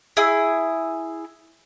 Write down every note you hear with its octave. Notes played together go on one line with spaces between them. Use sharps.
E4 G#4